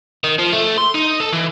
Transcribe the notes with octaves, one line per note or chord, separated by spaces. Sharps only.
D#3
F3
A3
C6
D#4
A4
E3